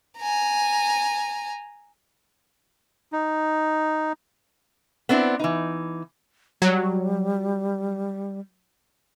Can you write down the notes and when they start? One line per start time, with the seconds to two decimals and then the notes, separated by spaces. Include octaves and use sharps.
0.18 G#5 A#5
3.13 D#4
5.09 B3 C4 D4 E4
5.40 E3 D#4
6.62 F#3 G3